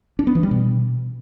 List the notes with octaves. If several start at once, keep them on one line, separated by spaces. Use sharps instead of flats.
D4
B3
E3
G3
B2